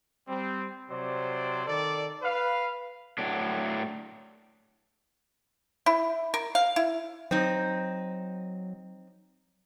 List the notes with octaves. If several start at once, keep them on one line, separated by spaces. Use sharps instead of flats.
G3 C4
C3 F#3 C5 D5
D#3 A4 D5
B4 F5
A2 F#3 D4
E4
A#4
F5
E4
F#3 C4 D#4